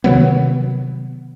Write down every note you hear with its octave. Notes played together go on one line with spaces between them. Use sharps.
C3 D#3 F#3 B3